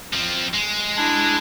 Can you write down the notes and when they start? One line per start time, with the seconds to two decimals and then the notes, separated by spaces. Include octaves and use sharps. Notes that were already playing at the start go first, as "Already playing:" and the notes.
0.13 F3 C4
0.54 G#3
0.97 D4 E4